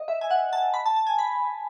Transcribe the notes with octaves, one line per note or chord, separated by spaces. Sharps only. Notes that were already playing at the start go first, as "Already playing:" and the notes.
Already playing: D#5
E5
G#5
F#5
A5
B5
A5
A5
G#5
B5